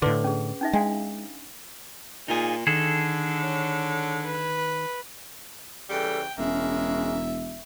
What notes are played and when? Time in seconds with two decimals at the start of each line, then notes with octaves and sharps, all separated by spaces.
0.02 A2 D3 B4 C6 D6
0.24 C#4 G#4
0.61 C#4 D#4 E5
0.73 G#3 D4 F5
2.28 A#2 D#4 F4 G#4
2.67 D3 D#3 G#4 A4
3.41 C#5
4.22 B4
5.90 C#3 E3 G3 A4 G5
6.38 E1 C#3 G#3 A#3 C#4 E5